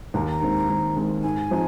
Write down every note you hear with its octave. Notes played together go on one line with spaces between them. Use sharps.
D#2 A#5
A#5
D#3 G#3 C4
D#2
D#3 G#3 C4
G#2 G#5
F3 C4 D#4